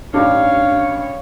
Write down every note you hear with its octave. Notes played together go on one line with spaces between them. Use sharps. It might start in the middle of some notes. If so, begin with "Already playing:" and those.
A1 G2 D4 D#4 C#5 F5